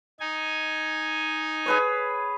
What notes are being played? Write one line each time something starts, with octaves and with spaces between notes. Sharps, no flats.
D#4 G#5
G#4 B4 C#5